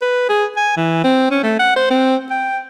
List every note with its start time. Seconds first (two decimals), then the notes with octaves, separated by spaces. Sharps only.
0.02 B4
0.29 G#4
0.56 G#5
0.77 E3
1.04 C4
1.31 C#4
1.43 A3
1.59 F#5
1.76 C5
1.91 C4
2.31 G5